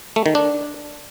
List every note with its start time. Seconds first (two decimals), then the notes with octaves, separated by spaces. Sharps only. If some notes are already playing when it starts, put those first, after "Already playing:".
0.16 A3
0.26 D#3
0.35 D4